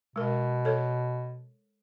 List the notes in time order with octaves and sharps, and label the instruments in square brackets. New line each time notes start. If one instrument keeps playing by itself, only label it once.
[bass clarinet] B2 [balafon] G#3 A#4
[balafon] A4 C#5